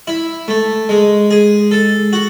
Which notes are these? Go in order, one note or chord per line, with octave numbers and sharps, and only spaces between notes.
E4
A3
G#3
G#4
A4
F#4